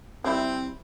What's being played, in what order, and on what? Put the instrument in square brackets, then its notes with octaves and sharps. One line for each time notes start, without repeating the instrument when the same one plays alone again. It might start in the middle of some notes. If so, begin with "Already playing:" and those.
[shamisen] G3 E4 [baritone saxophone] C4